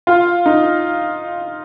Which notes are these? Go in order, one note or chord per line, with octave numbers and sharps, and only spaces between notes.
F4
D#4